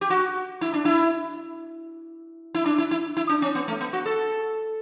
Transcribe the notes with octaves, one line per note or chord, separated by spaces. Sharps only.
G4
F#4
E4
D4
E4
E4
D4
E4
E4
E4
D4
C#4
B3
A3
B3
F#4
A4